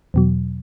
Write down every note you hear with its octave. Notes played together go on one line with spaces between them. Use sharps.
E2 B2 F#3